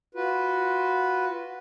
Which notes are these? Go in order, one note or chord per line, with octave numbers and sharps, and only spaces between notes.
F4 F#4 B4